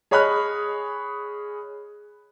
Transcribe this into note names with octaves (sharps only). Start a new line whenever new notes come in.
G#4 C#5 D#5 B5 F6 F#6